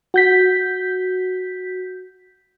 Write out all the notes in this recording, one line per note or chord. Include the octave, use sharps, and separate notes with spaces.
F#4 G6 B6